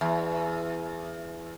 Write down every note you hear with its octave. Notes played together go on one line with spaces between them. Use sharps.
E2